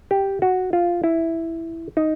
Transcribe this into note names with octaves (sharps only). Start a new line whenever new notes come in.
G4
F#4
F4
E4
D#4